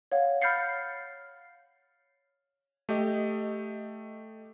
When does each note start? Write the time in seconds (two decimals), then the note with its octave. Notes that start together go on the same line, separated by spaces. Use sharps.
0.12 C#5 F5 F#5
0.42 B5 F6 G6 A6 C7 C#7
2.89 A3 G4 D#5